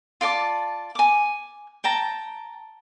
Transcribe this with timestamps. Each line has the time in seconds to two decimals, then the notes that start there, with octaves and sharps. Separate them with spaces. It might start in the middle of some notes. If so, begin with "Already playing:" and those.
0.21 F4 D5 A5 D6
0.95 G#5 D6
1.84 G5 A5 A#5